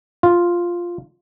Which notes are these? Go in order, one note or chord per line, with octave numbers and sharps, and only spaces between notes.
F4